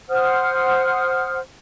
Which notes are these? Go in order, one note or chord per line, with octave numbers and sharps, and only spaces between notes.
C5 F#5 D#6 F6